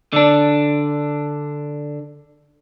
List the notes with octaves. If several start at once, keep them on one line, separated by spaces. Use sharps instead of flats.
D3 D4